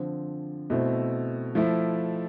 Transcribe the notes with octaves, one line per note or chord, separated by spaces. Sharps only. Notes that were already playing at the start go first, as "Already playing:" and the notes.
Already playing: D3 F3 C4
B2 A3 C4 E4
F3 A3 E4